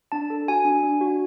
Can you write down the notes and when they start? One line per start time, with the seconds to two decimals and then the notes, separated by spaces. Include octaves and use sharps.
0.12 D4 A5
0.30 A4
0.48 F#4 G#5
0.65 D4
0.83 D4
1.01 F#4